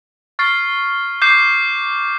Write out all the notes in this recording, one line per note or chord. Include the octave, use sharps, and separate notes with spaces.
C#6 F6 A6 C7
D6 G6 C7